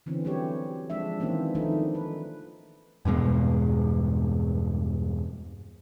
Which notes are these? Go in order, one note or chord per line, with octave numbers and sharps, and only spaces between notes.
D3 E3 C4 C#4
F#3 G3 A3 C4 G4 C#5
F3 G#3 D4 E5
D#3 E3 A#3 C4 C#4
D#3 F3 A3 D4 D#4
B4
E2 G2 B2 G#3